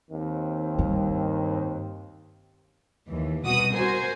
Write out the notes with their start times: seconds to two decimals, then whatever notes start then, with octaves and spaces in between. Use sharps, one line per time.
0.10 D#2 D#3 C4
0.79 G2
3.08 D#2 E3
3.45 C2 B2 F#4 D#6
3.76 F#4 A#4 C5 G#5